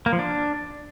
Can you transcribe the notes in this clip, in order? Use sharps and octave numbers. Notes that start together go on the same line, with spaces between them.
A#3
F3
D4